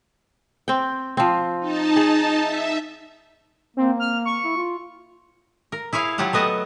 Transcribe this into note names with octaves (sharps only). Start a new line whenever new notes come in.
C4 G5
F3 C4
D#4 A5
G#4
E5
A#3 C4
F6
C#6
E4
F4
A#4
E4 G#4 C#5 F5
F#3 F4 G4 F#5 A5
A3 B3 D#5 F#5 A5